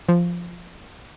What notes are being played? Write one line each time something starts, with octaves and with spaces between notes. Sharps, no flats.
F3